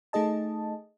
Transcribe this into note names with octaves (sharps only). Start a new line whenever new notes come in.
A3 D#4 G#4 D#5 A5